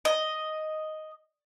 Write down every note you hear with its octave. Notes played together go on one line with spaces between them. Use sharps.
D#5